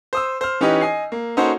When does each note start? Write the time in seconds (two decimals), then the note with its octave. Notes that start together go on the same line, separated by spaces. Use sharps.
0.13 C5 D#6 E6
0.41 C5 F6
0.61 E3 C#4 D#4 G4 B4 D#5
0.81 D#5 G#5 C7
1.12 A#3
1.37 A#3 C#4 D#4 F#4 A4 C5